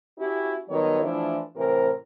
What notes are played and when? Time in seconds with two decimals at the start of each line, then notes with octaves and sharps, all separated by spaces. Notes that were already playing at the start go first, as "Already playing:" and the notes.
0.18 C#4 E4 F#4 G4
0.69 D#3 F#3 G3 B3 A4 C#5
1.02 E3 F3 A3 D4 E4
1.56 A2 C3 E3 A#4 C5